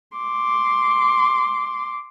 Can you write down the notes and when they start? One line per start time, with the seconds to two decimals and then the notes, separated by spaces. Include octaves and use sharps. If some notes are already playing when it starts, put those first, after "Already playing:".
0.17 C6 D6